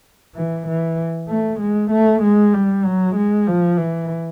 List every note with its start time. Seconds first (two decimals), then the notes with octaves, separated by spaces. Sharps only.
0.36 E3
0.68 E3
1.29 A3
1.60 G#3
1.91 A3
2.23 G#3
2.54 G3
2.85 F#3
3.16 G#3
3.48 F3
3.78 E3